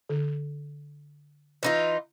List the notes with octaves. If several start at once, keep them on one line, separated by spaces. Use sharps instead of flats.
D3
E3 D#4 F4